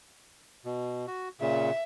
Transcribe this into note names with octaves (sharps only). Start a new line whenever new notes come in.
B2
F#4
A#2 C#3 E5